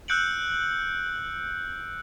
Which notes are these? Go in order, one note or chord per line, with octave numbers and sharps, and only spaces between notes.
E6 F#6 G6 C#7 D7 F#7